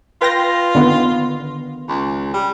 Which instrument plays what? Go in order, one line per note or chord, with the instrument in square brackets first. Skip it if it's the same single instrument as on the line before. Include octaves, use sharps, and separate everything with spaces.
[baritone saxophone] F4 [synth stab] B4 G5 A#6
[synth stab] D3 D#3 B3
[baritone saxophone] C#2
G3